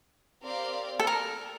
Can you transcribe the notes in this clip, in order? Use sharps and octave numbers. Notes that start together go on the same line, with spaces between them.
C4 G4 A#4 D5 F5
A4
A#4